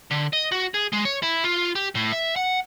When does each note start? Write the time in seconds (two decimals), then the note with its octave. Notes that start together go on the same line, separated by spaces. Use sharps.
0.11 D3
0.33 D#5
0.52 F#4
0.74 G#4
0.93 G#3
1.05 C#5
1.23 E4
1.44 F4
1.75 G4
1.95 A2
2.12 E5
2.36 F#5